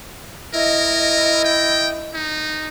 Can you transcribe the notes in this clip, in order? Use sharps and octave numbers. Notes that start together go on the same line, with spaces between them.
E4 A#4 D#5
G5
D#4